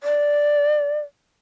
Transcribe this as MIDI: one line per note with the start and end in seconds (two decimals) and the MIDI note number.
0.03 0.99 74